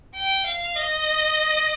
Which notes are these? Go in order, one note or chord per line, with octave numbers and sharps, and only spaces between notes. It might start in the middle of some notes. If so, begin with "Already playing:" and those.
G5
F5
D#5